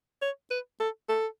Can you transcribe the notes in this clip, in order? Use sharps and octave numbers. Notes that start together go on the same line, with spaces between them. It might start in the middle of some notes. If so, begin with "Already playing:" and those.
C#5
B4
A4
A4